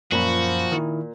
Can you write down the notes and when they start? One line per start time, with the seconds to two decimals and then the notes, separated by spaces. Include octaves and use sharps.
0.12 F#2 A#2 F3 F#4 B5
0.72 D#3 E4